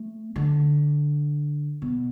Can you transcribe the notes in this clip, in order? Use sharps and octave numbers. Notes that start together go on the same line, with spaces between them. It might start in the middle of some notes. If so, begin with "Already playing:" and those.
Already playing: A3
D3
B2